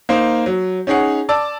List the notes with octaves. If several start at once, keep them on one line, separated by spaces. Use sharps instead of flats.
A#3 D#4 C5
F#3
C#4 D#4 G#4 C#5 F#5
D5 A5 D6 E6